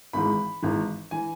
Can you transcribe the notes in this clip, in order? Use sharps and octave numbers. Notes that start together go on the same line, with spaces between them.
G#1 G#2 E3 B5
G#1 G#2 E3
E3 G#5